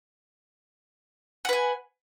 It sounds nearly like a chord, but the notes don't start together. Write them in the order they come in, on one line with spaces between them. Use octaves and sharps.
F#5 B4 G#5